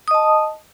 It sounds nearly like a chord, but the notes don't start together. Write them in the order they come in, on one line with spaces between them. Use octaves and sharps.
D#6 D#5 A5